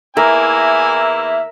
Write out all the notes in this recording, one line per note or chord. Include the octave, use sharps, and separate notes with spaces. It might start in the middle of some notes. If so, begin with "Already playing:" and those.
E2 A#3 E4 A#4 E5 G#5